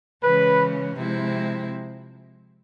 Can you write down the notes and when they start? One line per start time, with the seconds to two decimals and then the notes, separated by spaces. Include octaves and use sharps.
0.24 C#3 E3 G#3 C#4 B4
0.95 C3 F3 G#3 C4 E4